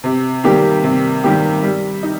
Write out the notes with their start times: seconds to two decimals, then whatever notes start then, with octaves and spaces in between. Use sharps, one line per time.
0.04 C3
0.44 D#3 G3 A#3 G4
0.84 C3
1.24 D#3 G3 A#3 G4
1.63 G3
2.03 D#4